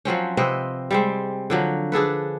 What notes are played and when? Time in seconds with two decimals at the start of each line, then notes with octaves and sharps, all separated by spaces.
0.05 F3 F#3 C4 C#4
0.37 C3 C4 B4 D#5
0.91 G3 G#3 C4
1.50 D3 F3 F#3
1.92 D4 G#4 A4 B4